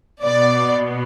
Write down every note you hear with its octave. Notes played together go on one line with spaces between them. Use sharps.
B2 B3 D5